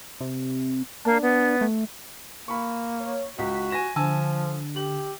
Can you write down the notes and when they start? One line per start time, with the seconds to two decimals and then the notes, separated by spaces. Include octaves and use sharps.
0.21 C3
1.05 A#3 D4
1.22 B3
1.61 A3
2.48 A#3 B5 C#6
3.00 C#5
3.38 C#2 F#4 B6
3.70 G#5 A#6 E7
3.96 D3 F3 G#5 A5 E6
4.76 G4 F#7